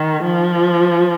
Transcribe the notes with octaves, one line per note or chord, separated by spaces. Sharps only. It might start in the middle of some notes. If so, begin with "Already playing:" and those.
Already playing: D#3
F3